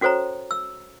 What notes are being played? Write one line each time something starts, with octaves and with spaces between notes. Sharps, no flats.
C#4 F#4 A4 C5 C#5 A#5
E6